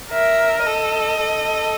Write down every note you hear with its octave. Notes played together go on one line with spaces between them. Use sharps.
A#4 E5
A4 D#5
A4